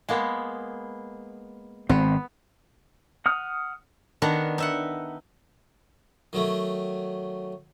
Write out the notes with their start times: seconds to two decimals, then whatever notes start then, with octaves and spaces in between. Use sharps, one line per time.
0.09 G#3 A#3 B3
1.89 G#1 B3 C4
3.26 F#5 D#6 F6
4.22 D#3 B3 D4 F#5 A#5
4.58 D#4 E5 F#5
6.33 D#3 F#3 A3